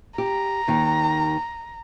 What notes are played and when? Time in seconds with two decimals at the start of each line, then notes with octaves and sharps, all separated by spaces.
0.18 G4 A#5
0.68 D#2 D#3